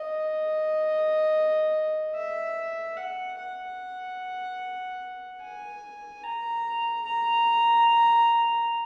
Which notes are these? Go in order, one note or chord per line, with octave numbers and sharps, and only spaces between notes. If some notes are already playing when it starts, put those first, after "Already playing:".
Already playing: D#5
E5
F#5
F#5
G#5
A#5
A#5